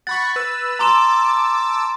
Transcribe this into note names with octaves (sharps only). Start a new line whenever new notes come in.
F#5 B5 C#6 A6
B4 E6
A5 A#5 C6 D6 E6 E7